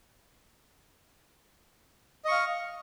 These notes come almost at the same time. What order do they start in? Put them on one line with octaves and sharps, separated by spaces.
D#5 C#6 F5